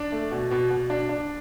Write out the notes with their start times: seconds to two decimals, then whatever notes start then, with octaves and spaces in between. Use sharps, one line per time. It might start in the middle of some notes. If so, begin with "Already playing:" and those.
Already playing: D4 D5
0.12 A3
0.31 B2
0.51 B2
0.70 B2
0.90 D4
1.09 D4